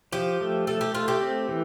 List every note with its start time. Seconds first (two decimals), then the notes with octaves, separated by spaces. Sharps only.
0.13 F3 G4
0.41 A3
0.67 A3 A4
0.81 G4
0.94 A3 F4
1.08 G4
1.21 C4
1.49 E3